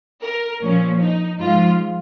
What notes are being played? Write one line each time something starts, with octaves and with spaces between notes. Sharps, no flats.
A#4
A#2 F3 C#4
D#4
G#2 F3 F4